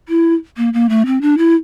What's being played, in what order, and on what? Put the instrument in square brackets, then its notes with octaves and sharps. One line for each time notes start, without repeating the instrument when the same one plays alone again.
[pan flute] E4
A#3
A#3
A3
C4
D4
E4